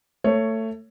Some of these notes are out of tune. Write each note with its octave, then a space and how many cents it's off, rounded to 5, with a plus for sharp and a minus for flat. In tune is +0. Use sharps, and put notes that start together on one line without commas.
A3 +25 C#5 +0